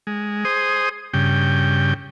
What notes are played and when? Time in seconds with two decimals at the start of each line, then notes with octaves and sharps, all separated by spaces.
0.07 G#3
0.45 G#4 C5 D#6
1.13 G2 C#3 G5